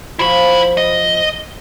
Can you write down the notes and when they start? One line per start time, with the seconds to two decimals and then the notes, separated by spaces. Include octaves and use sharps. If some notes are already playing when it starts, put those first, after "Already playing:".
0.19 F3 E4 F#4 B5
0.77 D#5